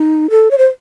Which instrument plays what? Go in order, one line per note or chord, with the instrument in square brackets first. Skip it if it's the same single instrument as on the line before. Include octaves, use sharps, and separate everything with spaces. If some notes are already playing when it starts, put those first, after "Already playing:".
Already playing: [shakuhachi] D#4
A4
C#5
C5